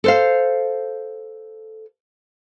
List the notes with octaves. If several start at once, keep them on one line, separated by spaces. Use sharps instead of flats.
A4 C5 F5